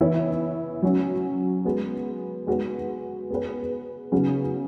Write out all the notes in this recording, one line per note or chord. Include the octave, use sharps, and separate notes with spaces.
E3 B3 E4 C#5
F#3 C#4 F#4
G#3 B3 F#4
G#3 B3 F#4 B4
B3 G#4 B4
C#3 F#3 B3 F#4